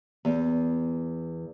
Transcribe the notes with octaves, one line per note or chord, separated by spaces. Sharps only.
E2